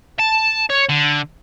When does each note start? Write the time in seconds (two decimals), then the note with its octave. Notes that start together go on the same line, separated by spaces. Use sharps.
0.19 A5
0.70 C#5
0.89 D3